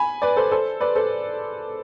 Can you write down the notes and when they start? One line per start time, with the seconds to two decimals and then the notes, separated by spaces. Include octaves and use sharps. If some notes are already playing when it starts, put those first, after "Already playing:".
Already playing: G#5 B5
0.22 B4 D5
0.36 A4 C5
0.51 A4 C5
0.81 B4 D5
0.96 A4 C5